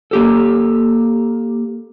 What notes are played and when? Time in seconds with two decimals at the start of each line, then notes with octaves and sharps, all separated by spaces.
0.11 A#3 G4 A4